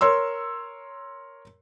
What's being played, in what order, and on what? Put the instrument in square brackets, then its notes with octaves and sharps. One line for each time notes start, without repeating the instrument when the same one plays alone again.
[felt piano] A#4 C#5 C6 E6